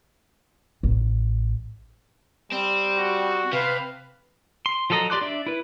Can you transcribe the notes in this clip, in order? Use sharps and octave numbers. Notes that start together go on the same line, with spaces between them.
A1
G3 C4
F#4
C3 B4 F5
C6
F3 F#3 A4 D#5 A#5
G4 D5 C6 D6 F#6
D4 D5 E5
E4 B4